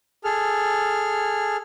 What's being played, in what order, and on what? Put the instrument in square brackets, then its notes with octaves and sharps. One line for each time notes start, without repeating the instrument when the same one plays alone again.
[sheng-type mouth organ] G#4 A4 F6